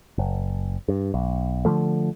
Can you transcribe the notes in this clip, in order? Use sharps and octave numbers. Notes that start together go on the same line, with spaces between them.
F#1
G2
B1
D3 D#3 F3 A3